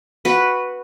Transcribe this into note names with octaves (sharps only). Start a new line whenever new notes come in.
F#4 B4